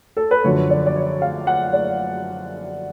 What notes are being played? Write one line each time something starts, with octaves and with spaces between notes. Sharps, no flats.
A4
B4
F#2 D3 F3 C#5
D5
D5
C#5
F5
F#5
D5